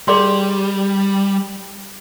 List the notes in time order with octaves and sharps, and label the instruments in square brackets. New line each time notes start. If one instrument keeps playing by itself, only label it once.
[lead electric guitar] G3 [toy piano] G#4 D5 C6